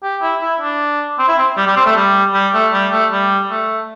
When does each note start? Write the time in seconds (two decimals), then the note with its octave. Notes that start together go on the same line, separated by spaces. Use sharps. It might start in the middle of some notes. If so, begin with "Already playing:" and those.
0.03 G4
0.22 E4
0.41 E4
0.60 D4
1.19 C4
1.28 E4
1.38 C4
1.57 G3
1.67 G3
1.76 C4
1.85 A3
1.96 G3
2.34 G3
2.54 A3
2.73 G3
2.92 A3
3.12 G3
3.50 A3